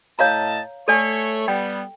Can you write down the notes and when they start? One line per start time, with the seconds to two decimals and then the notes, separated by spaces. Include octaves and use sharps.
0.19 A2 C#5 D#5 F5 A5 A#5
0.88 A3 A4 C#5 D5 G#5
1.48 G3 B3 G5